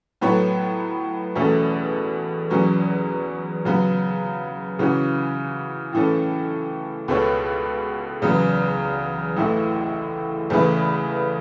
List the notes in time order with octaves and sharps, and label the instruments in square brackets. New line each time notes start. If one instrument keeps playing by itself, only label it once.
[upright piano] A2 F#3 B3 A4 C#5
E2 B2 A3 C#4 A4
E2 B2 F#3 C#4
C#3 F#3 B3
C#3 E3 C#4 F#4
A2 E3 C#4 A4
C#2 B2 B3 A4 C#5
E2 C#3 F#3 B3
A1 A2 E3 A3 E4
E2 C#3 A3 E4 B4